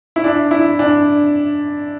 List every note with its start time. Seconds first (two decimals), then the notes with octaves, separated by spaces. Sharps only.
0.16 E4
0.24 D4
0.51 E4
0.79 D4